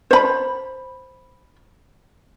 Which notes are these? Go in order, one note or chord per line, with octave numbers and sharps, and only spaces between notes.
C5 B5